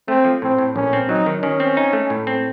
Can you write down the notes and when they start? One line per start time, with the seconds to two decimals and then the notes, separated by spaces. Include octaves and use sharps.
0.08 A3 C4
0.25 F3
0.42 A2 C4
0.59 A2
0.76 A#1 C#4
0.93 C4
1.09 F#3 D#4
1.26 D#3
1.42 D#3 C#4
1.60 C4
1.77 D#4
1.93 A3
2.10 A2
2.27 C4